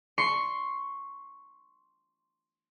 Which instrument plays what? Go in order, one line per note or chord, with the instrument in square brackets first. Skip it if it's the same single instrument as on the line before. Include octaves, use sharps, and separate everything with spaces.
[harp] C6 C#6 C7 C#7